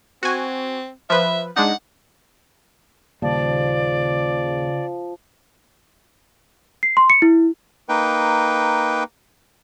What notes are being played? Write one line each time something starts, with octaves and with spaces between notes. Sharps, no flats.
C4 F#4 G#5
F3 B4 E5
G#3 D4 D#4 F#5
D#2 A#2 C#3 F3 G3 D5
C7
C6
C#7
E4
A#3 D#4 B4 G5